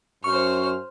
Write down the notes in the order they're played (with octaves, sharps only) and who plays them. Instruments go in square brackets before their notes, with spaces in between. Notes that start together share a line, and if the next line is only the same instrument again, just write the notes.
[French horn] F#2 [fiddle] C5 F6 [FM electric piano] C#6